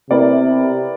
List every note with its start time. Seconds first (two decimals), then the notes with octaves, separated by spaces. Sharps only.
0.10 C3 B3 E4 G4 A#4 D5